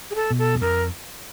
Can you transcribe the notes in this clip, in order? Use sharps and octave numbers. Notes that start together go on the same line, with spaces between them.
G#4
A4
B2
A4
E2
F2 A#4